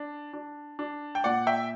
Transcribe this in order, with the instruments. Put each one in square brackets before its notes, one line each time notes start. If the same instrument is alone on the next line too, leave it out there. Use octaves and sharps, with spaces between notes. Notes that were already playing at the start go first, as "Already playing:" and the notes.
Already playing: [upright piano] D4
D4
D4
G5
A#2 D5 F#5
E5 G5